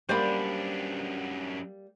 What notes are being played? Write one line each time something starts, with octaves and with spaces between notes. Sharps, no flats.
F#2 G3 A#3 D4 C5 D5 B5